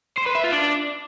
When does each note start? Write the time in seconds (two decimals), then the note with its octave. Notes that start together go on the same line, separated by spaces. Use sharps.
0.17 C5
0.26 B4
0.35 E5
0.44 F4
0.52 D4